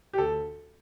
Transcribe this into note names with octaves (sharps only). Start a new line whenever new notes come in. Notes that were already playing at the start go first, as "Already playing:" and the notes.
G4
D2 A4